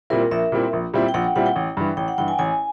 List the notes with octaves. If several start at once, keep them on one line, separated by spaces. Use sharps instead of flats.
A#2 G3 C4 E4 A#4
A#1 E5
A#2 G3 C4 E4
A#1
A#2 G3 C4 E4
G5
A#1 F#5
G5
A#2 G3 C4 E4 F#5
G5
A1
G2 E3
A1 G5
F#5
G2 E3 G5
G#5
A1 G#5